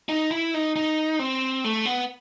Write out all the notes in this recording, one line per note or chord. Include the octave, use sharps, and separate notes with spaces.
D#4
E4
D#4
D#4
C4
A3
B3